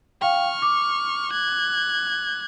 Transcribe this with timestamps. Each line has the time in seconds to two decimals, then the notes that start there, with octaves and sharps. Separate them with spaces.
0.22 F5 G5 C#6 F6
0.62 D6
1.31 F#6 G#6